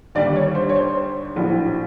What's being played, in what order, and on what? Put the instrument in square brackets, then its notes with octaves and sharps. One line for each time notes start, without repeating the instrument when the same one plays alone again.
[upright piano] D#2 D3 G3 D5
C#5
C5
C#5
C5
A#1 A2 F#3